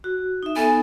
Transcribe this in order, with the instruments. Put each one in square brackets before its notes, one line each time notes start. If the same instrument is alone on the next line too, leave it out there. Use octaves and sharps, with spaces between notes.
[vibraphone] F#4
D#4 E5
[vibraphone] B3 D#4 A4 [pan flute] G#5